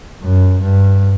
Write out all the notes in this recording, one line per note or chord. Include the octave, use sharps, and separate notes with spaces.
F#2
G2